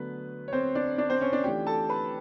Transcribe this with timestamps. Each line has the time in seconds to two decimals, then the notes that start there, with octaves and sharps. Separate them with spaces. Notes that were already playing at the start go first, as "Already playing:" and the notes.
Already playing: D3 F#3 A3 B3 B4
0.48 C#5
0.53 C4 C5
0.75 D4 D5
0.98 D4 D5
1.10 C4 C5
1.21 C#4 C#5
1.33 D4 D5
1.44 E3 A3 D4 F4 G4 G5
1.67 A4 A5
1.89 B4 B5